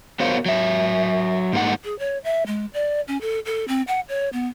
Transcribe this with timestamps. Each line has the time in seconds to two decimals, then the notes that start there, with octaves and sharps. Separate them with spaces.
0.20 B3 F#4 A#4 C5 C#5 F5
0.46 F#3 E5
1.53 G#2 G3 A#3 D#4 F#5
1.84 G#4
1.99 C#5
2.24 E5
2.46 G#3
2.74 D5
3.08 C#4
3.21 A4
3.46 A4
3.68 C4
3.87 F#5
4.09 C#5
4.33 B3